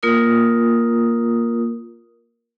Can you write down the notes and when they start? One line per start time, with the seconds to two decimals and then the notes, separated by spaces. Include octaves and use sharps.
0.03 A#3 F4 A#4 D#6